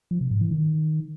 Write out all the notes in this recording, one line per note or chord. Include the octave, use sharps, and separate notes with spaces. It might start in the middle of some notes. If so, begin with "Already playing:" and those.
F3
C3
G#2
E3
D#3